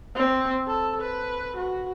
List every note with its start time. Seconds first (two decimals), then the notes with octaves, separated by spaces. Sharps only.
0.15 C4
0.67 A4
1.01 B4
1.56 F#4